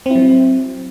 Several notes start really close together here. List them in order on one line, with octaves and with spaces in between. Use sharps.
C4 E4 F#3